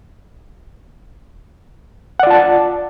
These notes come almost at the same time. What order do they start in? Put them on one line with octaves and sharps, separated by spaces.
F#5 D5 F4 A5